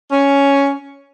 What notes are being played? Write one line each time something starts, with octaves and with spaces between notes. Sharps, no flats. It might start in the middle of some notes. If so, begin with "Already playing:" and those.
C#4